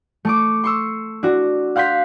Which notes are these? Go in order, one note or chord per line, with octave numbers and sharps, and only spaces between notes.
A3 C#6 D6
C6 C#6 E6
D4 F#4
F5 F#5 C6 G6 B6